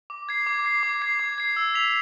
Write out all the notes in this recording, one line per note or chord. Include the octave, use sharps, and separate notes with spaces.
D6
G#6 C7
D6
G#6 C7
D6
G#6 C7
D6
G#6 C7
E6
B6 F7